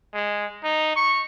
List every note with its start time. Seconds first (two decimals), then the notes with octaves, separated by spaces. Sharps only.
0.14 G#3
0.64 D#4
0.96 C#6